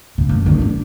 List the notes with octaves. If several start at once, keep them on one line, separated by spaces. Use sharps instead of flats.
C#3
F#1
D3
D4 D#4